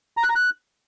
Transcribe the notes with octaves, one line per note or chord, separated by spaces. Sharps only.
A#5
F#6
A#5
F#6